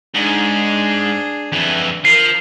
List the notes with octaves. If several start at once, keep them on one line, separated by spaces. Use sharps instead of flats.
G#2 D4 G#4
F2 E3
F3 A#4 C7